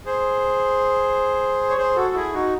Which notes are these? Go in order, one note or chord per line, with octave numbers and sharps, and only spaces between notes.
G#4 C5
C#5
G#4 C5
F#4 A4
E4 G#4
D#4 F#4